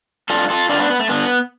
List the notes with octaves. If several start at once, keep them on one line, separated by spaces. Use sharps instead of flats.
G2 D3 F4 A4
F4 A4
G2 D3 D4 F4
B3 D4
B3
A3
G2 D3 B3